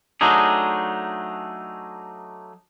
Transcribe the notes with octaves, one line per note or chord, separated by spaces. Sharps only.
F#3 A3 D4 D#4 G#4